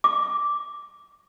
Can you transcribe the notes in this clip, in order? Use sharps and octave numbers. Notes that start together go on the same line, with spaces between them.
D6